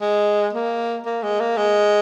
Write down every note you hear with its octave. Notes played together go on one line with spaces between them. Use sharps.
G#3
A#3
A#3
G#3
A#3
G#3